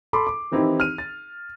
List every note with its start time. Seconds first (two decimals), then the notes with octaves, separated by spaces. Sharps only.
0.13 A4 B5 C6 D6
0.27 D6
0.51 D#3 E3 C4 D#4 E4 G4
0.80 F6 D#7
0.98 A6